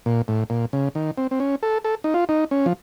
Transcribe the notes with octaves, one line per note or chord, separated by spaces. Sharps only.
A#2
A2
A#2
C#3
D#3
C4
C4
C#4
A4
A4
D#4
F4
D#4
C#4
F3